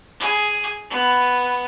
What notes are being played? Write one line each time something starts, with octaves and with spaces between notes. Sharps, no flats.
G#4
B3